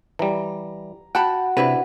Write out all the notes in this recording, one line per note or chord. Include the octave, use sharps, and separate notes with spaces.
E3 G3 A#5
F#4 F#5 G5 A5 B5
C3 D4 E4 B4